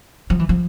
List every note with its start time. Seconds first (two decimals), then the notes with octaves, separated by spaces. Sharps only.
0.30 F3
0.39 E3
0.49 F3